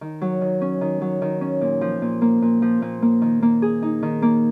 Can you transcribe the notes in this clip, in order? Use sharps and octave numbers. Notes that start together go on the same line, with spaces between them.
D#3
F#3
D#3
C#4
D#3
F#3
D#3
C#4
A#2
F3
A#2
A#3
A#2
F3
A#2
A#3
D#3
A#3
G#4
D#4
D#3
A#3